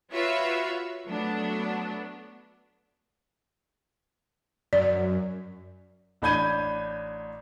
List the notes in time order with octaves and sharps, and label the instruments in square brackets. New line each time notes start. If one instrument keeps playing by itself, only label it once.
[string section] F4 F#4 B4 C#5 E5 F5
F#3 A3 B3 D4
[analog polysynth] F#2 [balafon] D5
[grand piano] A1 D4 B5 G6 G#6 D#7